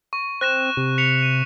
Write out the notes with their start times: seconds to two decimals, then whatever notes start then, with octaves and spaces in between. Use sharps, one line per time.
0.13 C#6
0.41 C4 F#6 A#6 E7
0.77 C3
0.98 B6 C#7 F7
1.22 D#7